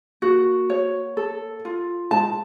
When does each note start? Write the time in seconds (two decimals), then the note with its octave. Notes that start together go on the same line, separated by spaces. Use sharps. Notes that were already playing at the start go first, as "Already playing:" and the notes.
0.22 A#3 F#4
0.70 C#5
1.17 A4
1.65 F4
2.11 G#3 A5